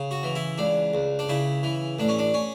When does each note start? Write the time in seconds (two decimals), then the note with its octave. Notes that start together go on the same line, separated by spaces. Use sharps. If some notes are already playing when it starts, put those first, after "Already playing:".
Already playing: C#3
0.11 F#4
0.23 E3
0.35 E4
0.58 C#2 D4
0.93 C#2
1.19 D4
1.29 C#3 E4
1.63 E3
1.99 A1 D4
2.08 C#4
2.19 D4
2.34 C#4